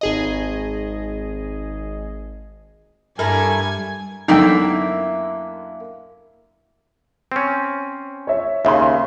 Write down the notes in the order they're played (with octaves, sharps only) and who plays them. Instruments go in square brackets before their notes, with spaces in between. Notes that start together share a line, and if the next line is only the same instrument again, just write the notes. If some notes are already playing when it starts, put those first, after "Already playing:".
[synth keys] G#1 G#4 D#5
[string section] G2 G3 [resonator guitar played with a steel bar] A3 E4 A#4 [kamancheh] G#5
[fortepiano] F#2 D3 B3 [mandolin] A#3 E4 E6 [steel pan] D#4 G5
[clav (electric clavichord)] C4 C#4
[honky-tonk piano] C#5 E5
[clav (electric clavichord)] D#2 C#3 [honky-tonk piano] E5 C6